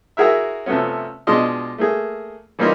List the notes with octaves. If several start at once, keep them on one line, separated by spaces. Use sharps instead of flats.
E4 F#4 G#4 A#4 E5
C3 F3 A3 B3 C#4
B2 G#3 D4 F4 D#5 C6
A3 A#3 G#4
E3 G3 A#3 C#4 D#4 F4